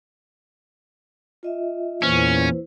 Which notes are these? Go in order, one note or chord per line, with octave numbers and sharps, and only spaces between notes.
F4 D#5 E5
E2 A#2 C#4 E4 B4 C5